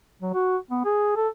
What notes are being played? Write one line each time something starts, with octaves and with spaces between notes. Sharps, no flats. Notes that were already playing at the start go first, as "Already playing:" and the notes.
F#3
F#4
B3
G#4
A4